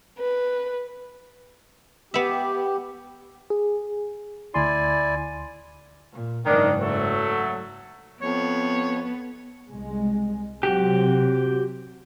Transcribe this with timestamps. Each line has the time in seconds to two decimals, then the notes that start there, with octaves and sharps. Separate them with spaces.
0.19 B4
2.14 B3 G4 E5
3.50 G#4
4.54 D2 E4 D5 G#5 C6
6.13 A#2
6.46 F#1 G#2 D#3 D4
6.81 F#3 A3
8.22 F2 B3 C#5
9.71 C2 G#3
10.63 C3 F#3 C4 F#4 G4